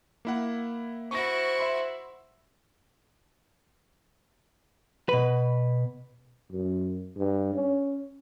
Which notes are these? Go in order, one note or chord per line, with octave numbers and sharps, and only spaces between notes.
A#3 E4 F#5
E4 F#4 C5 C#6 A#6
E5 B5 C6
B2 B4
F#2
G2
C#4